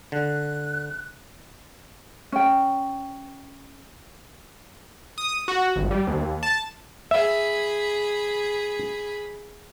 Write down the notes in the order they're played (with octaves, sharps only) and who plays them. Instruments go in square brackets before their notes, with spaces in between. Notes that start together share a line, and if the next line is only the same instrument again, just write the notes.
[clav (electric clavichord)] D3 [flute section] F#6
[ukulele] C#4 G5
[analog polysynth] D#6
F#4
G#1
G3
D#2
A5
[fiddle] G#4 B5 [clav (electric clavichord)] E5